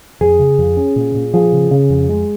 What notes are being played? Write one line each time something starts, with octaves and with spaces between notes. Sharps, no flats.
F2 G#4
C#3
F2
C#4
A#2
A#2
F3 G#4
C#3
C#3
F2
G#3